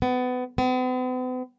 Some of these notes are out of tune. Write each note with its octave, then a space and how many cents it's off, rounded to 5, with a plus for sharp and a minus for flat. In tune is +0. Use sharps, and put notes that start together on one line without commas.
B3 +25
B3 +45